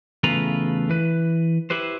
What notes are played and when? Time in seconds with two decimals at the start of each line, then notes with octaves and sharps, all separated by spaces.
0.24 E2 C#3 A3 F4 B4 A#5
0.89 E3 B4
1.70 E4 G4 B4 C5